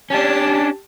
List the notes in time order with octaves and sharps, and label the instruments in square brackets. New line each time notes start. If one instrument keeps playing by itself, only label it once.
[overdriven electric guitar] C#4 D4 [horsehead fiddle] G4 A5